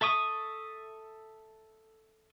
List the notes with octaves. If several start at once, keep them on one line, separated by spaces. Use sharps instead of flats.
A4 E5 C#6 D#6